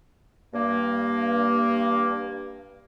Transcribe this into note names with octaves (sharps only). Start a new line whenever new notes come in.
G2 A#3